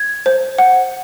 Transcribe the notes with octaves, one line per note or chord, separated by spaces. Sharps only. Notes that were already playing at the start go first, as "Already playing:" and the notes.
Already playing: G#6
C5
F#5